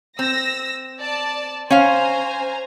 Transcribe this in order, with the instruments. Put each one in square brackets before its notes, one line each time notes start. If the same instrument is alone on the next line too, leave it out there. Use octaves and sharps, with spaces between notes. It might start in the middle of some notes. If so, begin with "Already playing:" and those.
[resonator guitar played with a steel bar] C4 [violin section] E6 A#6
[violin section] D5 A5
[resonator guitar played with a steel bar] C#4 F5 [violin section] C5 G#5 A#5